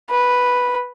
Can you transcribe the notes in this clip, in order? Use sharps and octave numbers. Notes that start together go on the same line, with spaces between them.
B4